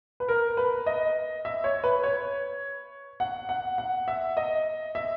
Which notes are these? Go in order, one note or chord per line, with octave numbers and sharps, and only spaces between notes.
B4
A#4
B4
D#5
E5
C#5
B4
C#5
F#5
F#5
F#5
E5
D#5
E5